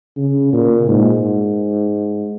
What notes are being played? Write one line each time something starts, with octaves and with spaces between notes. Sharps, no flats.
C#3
A#2
G#2